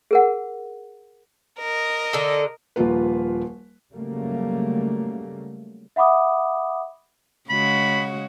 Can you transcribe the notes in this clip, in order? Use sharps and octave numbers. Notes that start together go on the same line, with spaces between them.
G#4 A#4 F#5
A#4 D#5
D3 A4
D#1 F3 A#3 F4 B4
C#3 F#3 G3 A3 A#3
E5 F#5 B5 D6 D#6
C#3 G#3 F#4 B5